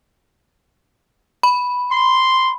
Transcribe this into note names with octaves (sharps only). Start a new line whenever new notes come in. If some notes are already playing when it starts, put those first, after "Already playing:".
B5
C6